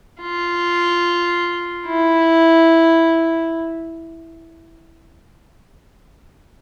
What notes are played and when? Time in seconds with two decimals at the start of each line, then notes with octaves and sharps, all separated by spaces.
0.21 F4
1.87 E4